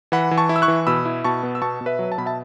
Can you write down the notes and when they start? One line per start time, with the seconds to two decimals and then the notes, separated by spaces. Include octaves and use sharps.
0.12 E3 F#5 B5
0.31 E3
0.38 A5 C#6
0.49 E4
0.56 E6
0.62 C#6 F#6
0.68 E3
0.87 B2 B5 E6
1.05 E4
1.24 B2 A5 C#6
1.43 B3
1.55 E6
1.62 B2 A5 C#6
1.81 B2
1.86 B4 E5
1.99 F#3
2.12 A5
2.18 B2 B5
2.26 E5 A5